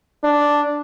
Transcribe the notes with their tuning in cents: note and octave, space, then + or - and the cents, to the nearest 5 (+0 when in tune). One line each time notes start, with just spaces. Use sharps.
D4 -5